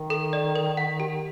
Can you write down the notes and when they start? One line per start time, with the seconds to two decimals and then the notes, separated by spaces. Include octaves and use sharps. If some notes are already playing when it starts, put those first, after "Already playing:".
Already playing: D#3
0.10 A4
0.33 D5
0.55 A#4
0.77 F#5
1.00 G4